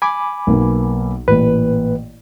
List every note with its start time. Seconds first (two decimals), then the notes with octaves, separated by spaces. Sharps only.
0.02 G#5 B5 D6
0.47 B1 A#3 B3
1.28 A1 A#2 B4